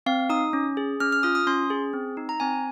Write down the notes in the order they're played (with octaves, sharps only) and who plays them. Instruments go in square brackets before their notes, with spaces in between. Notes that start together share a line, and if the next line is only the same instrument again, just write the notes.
[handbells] C4 F5
D#4 D#6
C#4
G#4
C#4 F6
F6
F4 D#6
D#6
C#4 C6
G#4
C4
D#4
A#5
C4 G#5